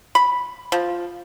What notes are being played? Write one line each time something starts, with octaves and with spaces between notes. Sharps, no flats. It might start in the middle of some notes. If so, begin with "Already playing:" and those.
B5
F3